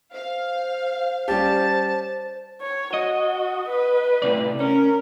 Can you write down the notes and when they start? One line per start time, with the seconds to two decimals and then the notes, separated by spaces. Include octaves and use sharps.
0.14 C5 F5
1.28 G3 C#4 G4 A5
2.61 C#5
2.94 F#4 D#5
3.69 B4
4.22 A2 C3 D5
4.60 C#4 A#4